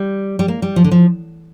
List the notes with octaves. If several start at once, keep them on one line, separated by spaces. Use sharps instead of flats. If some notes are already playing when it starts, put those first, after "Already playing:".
Already playing: G3
G3
A#3
G3
F3
D3
F3